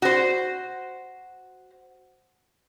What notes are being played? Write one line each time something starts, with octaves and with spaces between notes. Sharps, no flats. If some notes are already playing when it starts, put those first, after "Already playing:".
F#4 C5